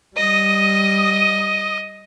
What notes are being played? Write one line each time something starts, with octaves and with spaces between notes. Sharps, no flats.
G3 D#5 D#6